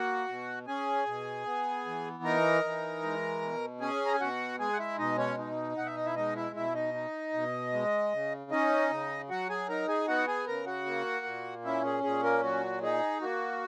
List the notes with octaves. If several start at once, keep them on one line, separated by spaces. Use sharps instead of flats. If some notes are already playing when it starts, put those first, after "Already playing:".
Already playing: A#3 F#4 F#5
B2
C#4 G#4 G#5
B2
B3
E3
D#4 A#4 A#5
E3
G#3
B2
C#4 G#4 G#5
A#5
G#5
B2 F#4 F#5
G#3 G#4 G#5
F#5
E4 E5
B2 D#4 D#5
C#4 C#5
D#4
B2 F#5
E5
D#5
E4 E5
G#3 D#4 D#5
E4 E5
B2 E4 E5
D#4 D#5
D#4
B2
G#3
C#3
C#4 D#4 D#5
C#3
F#3 F#4 F#5
G#4 G#5
D#4 A#4 A#5
G#4 G#5
B3 F#4 F#5
G#4 G#5
C#3 A#4 A#5
F#4 F#5
A#3
A#2
C#4 E4 E5
G#4
A#2 G#4
A#3 A#4
F#3 F#4
D#4 G#4
A#3 F#4